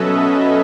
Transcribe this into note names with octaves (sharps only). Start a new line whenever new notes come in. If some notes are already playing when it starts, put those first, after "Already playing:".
Already playing: B2 F#3 C#4 A4 B4 D#5 E5